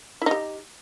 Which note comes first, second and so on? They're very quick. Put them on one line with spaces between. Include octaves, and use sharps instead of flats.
E4 D#4 G4